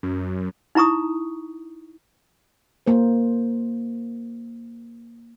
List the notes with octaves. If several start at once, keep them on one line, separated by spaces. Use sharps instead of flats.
F#2
D#4 E4 A#5 C#6 D#6
A#3 C5